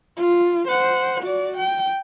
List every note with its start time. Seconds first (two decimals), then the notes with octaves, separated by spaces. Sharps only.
0.17 F4
0.68 C5 F#5
1.23 F#4 D5
1.57 G5